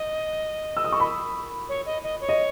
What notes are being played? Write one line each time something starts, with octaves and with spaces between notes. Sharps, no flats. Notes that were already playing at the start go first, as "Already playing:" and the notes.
Already playing: D#5
E6
D#6
C#6
B5
C#5
D#5
D#5
C#5
D#5